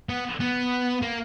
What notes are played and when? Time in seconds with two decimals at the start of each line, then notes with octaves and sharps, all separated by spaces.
0.09 B3
0.40 B3
1.02 A#3